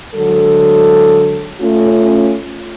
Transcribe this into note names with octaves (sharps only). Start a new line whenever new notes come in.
D3 F#3 G#3 A4
A3 C#4 F4